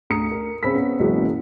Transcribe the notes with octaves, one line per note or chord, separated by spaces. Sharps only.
D2 A#5 D#6 C#7
A#4
C#3 C4 B5 E6 B6
B3 C#4
F#1 C#2 B2 E3 F#3